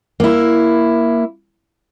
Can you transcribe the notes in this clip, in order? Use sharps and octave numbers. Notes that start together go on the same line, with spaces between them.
A#3 E4